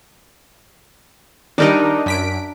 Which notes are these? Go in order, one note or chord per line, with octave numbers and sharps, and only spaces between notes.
D#3 G3 D4 D#4 A#4 D#5
F#2 B6 D7